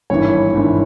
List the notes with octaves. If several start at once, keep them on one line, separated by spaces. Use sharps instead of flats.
G#1 G2 E3 C#5
G#1 G2 E3